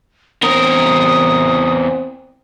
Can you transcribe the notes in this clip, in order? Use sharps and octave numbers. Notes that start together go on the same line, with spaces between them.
E2 C4 A#4 D#6